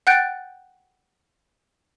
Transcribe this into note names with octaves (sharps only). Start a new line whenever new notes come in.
F#5 G5 F#6 G6 A6 D7